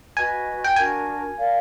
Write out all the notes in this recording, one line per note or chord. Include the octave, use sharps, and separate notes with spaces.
F#4 B4 D#5 G#5
G5
D4 F#4 A#4 G#5
A#4 D5 F5